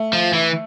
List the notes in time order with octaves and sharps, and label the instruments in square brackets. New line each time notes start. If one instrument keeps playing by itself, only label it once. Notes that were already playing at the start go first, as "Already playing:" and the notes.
Already playing: [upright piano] A3
[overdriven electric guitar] F3
E3